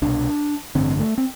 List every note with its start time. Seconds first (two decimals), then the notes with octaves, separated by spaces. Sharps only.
0.02 C2 B2 D4
0.75 A1 G2 D3 C4
1.00 A3
1.18 C4